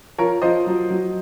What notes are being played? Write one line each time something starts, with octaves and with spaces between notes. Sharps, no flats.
F3 A#4 C#5
F3 C5 D#5
F#3
F#3